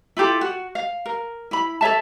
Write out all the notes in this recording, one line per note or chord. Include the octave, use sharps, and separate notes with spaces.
E4 F4 G4 A4
F#4
F5
A#4
E4 B5
A4 C#5 E5 A5